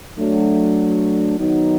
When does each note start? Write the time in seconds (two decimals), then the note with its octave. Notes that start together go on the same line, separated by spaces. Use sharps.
0.19 F#3 A3 D4
1.37 D#3 F#3 B3 D#4